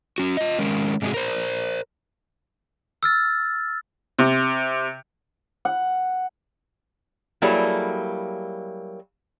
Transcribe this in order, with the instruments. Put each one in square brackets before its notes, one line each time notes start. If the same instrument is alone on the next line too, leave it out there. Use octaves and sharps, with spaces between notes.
[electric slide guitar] C#4 F#4
F4 D#5
D#3 G#3 C#4 A#4
G#2 C3 G#3 D#4 F#4 G#4
A#4 C5
[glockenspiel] E6 F6 A6
[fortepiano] C3
[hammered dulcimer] F#5
[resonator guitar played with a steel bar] F#3 G3 A#3 E4 G#4 A4